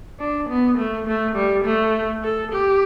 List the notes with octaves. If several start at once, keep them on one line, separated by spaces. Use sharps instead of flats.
D4
B3
A3
A3
G3
A3
A4
G4